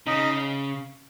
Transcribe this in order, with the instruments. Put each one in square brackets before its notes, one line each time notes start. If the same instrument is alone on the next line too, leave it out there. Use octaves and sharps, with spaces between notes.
[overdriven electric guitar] C#3 [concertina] D#4 D#5